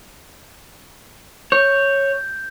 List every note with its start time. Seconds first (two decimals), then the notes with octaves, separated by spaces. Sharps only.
1.52 C#5 G6